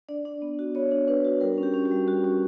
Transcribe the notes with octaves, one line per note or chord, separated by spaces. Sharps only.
D4 D5
D4
B3
F#4
B3 C#5
D4
D4 B4
F#4
G3 A#4
C#4
G4
C#4
F#4
G3
G3 F#4
C#4